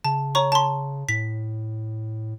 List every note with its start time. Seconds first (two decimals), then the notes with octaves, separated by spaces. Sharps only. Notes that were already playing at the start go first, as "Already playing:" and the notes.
0.05 C#3 A5
0.35 C#5 A#5 C#6
0.52 A5 C6
1.09 A2 B6